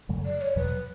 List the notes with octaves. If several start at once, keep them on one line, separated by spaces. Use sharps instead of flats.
F#2 C#3 F#3 A3
D5
C#5
E2 B2 F#3 B4